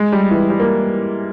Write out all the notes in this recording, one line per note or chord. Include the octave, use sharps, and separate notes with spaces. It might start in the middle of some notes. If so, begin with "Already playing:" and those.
Already playing: G#3
G3
E3
G3
A#3